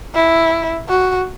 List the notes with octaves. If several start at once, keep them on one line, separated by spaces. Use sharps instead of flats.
E4
F#4